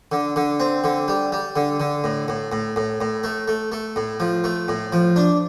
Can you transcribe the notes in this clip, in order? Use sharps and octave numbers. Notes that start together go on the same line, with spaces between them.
D3
D3
C4
D3
G3
G3
D3
D3
A2
A2
A2
A2
A2
A3
A3
A3
A2
F3
A3
A2
F3
D4